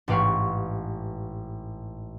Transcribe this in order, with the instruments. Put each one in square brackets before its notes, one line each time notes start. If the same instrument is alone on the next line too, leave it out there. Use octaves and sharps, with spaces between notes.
[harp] A1 G#2 G4 B4 F5 C#6